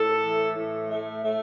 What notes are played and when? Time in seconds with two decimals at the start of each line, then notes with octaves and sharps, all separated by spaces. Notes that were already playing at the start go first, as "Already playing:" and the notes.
Already playing: A2 A4
0.22 E3
0.56 A2
0.89 A3
1.22 A3